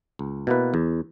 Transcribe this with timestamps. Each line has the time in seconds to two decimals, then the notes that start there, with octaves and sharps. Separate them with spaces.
0.19 C#2
0.47 B2 A#3 E4 B4
0.74 E2